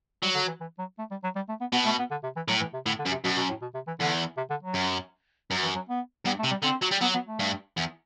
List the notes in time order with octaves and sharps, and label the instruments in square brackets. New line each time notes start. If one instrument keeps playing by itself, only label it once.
[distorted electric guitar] F#3 [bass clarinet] G3
[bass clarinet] D3
E3
E3
F#3
A3
G3
F#3
G3
A3
B3
[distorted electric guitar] B2 [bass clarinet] B3
[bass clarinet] A3
B3
D3
C3
E3
[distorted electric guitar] A2 [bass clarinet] F#3
[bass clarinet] E3
C3
[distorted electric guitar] A2 [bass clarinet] D3
[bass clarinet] D3
[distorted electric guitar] F#2
[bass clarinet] C3
[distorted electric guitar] F#2 [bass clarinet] B2
[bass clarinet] B2
A2
B2
C3
E3
[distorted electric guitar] E2 [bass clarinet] D3
[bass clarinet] C3
D3
F#3
[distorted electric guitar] F#2
[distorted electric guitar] F#2 [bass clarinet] F#3
[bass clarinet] E3
F#3
B3
[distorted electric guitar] G2 [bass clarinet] B3
[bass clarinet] A3
[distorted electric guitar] C3
[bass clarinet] G3
[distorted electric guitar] D3 [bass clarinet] C4
[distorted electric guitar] F#3
G3
[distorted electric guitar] F#3 [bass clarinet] B3
[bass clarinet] B3
A3
[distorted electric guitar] G2
E2